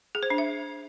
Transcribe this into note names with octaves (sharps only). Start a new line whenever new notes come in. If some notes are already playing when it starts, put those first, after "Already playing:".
G#4
C5
D4
E5